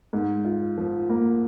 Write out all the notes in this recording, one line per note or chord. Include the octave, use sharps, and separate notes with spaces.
G#2
F4
F3
A#3